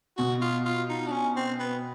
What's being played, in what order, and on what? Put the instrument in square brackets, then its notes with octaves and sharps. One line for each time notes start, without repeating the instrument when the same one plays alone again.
[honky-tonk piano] B2 [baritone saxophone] F#4
[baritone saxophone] F4
F4
D#4
D4
C#4
C4
B3